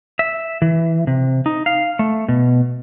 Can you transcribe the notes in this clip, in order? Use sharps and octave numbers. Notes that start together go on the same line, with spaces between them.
E5
E3
C3
D#4
F5
A3
B2